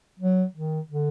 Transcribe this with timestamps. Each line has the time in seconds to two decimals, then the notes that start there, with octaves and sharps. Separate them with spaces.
0.19 F#3
0.55 D#3
0.90 D3